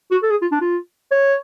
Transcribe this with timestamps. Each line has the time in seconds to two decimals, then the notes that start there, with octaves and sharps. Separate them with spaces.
0.11 F#4
0.23 A4
0.31 G#4
0.42 F4
0.52 D4
0.61 F4
1.11 C#5